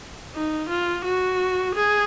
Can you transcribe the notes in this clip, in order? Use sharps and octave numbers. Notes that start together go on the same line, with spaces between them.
D#4
F4
F#4
G#4